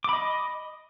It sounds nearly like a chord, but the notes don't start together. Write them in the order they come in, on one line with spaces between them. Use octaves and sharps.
D6 B5 D#5